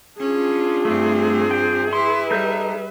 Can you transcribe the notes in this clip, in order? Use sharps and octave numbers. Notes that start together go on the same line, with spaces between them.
C#4 D4 F4 G#4
G2 A3 C4
G5
E4 B4 E5 C6
G3 D#4 A4 G6